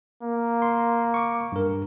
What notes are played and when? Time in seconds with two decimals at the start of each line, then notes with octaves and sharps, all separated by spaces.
0.22 A#3
0.62 C6
1.14 C#6 D6
1.52 G2 A#4